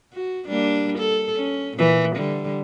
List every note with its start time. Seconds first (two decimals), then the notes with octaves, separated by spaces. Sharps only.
0.13 F#4
0.48 G3 A#3 D4
0.99 A4
1.36 C#4
1.77 A#2 E3
2.15 D3 G3